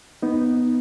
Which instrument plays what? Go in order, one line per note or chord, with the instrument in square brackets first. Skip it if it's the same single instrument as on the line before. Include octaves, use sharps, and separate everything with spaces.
[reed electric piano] B3 D#4